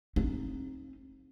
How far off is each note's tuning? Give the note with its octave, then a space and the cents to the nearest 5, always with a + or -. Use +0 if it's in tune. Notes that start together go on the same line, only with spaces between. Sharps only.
C4 +30 D#4 +0